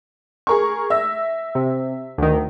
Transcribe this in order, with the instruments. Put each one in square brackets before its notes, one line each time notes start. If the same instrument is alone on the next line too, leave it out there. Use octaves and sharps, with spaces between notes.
[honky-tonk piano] G#4 A#4 C#6
E5 E6 A#6
[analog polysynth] C3
D2 D#3